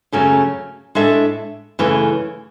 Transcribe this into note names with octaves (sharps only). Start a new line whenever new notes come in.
F#2 C#3 F#3 A3 C#4
A2 G#3 D4 A4 E5
F#2 C#3 E3 A3